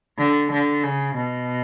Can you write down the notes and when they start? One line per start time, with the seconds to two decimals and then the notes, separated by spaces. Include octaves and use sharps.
0.19 D3
0.52 D3
0.83 C#3
1.16 B2